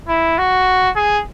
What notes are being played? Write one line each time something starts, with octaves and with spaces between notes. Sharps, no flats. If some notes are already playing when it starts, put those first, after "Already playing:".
E4
F#4
G#4